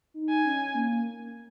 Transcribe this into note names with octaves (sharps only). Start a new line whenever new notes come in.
D#4
G#5
C#4
A#3